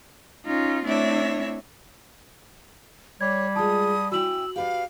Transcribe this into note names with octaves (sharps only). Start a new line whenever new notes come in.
C#4 D#4 F4
A3 C4 D4 E4 C#5 E5
G3 C#5 D6 G#6
G#3 F4 A5 D#6 G#6
C#4 E4 F#4 G5 E6 F#7
G4 B4 D5 F5